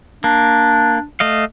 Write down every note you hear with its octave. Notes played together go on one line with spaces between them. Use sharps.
A#3 D4
A3 D#5 F5